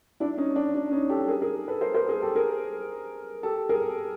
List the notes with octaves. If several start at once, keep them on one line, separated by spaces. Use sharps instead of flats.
D4 E4
C#4 D#4
D4
D4
C#4 D#4
G4 A4
G#4 A#4
G#4 A#4
A4 B4
A#4 C5
A#4 C5
G#4 A#4
G4 A4
G#4 A#4
G4 A4
G#4 A#4